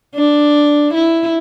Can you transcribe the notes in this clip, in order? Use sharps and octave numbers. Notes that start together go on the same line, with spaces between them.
D4
E4